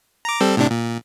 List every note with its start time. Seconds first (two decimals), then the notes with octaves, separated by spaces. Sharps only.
0.25 A#5 D6
0.41 G3 C4 A4
0.57 A2 C3 D4
0.70 A#2